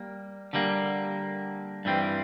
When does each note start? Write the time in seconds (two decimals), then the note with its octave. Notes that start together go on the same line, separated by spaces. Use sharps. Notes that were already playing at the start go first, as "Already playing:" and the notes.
Already playing: G3 A#3
0.53 D3 G3 A#3
1.85 G2 E3 G3 C4